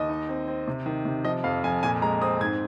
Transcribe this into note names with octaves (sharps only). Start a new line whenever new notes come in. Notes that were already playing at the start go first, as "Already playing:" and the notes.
Already playing: D#2 D#5
D#4
C4
C4
C3
D#3
C3
F3 D#5
F2 F5
F2 G#5
A#2 G#5
G#3 A#5
C4 D#6
G#2 G#6